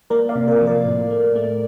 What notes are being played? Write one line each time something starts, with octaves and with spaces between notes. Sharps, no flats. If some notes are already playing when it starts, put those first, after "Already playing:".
A#3 A#4 D5
D5 F5
C3
A#4 D5
F3
A#4 D5
A2
A3
A3